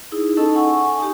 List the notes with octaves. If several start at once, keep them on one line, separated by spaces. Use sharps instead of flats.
D#4 E4 G#4
C#4 D#4 A4 D#5 A5 E6
F#5 G#5 C#6
G#5
D#4 G4